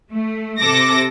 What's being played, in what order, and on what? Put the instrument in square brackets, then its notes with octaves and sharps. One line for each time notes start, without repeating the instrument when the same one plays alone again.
[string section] A3
C3 A4 D6 A#6